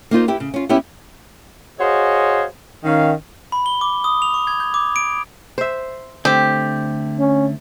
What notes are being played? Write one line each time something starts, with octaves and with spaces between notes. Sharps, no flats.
A#3 D#4 F4 C5
E4 G4 B4
C#3
C#4 F4
B3 C#4 E4 G4
F#4 G#4 C5 C#5 D#5 F5
D#3 C#4 F5
B5
G7
D6
D#6
F7
C#6
G#6
G6
D6
D7
C5 E5
D3 A3 C4 G4
C#4